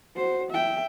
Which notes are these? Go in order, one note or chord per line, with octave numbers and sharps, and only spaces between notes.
F#4 C5
E5 G5